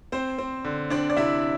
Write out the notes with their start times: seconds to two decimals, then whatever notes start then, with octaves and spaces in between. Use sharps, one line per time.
0.12 C4 C5
0.38 C4
0.65 D3
0.90 C4 D4 D5
1.10 D5
1.17 C3 E4 E5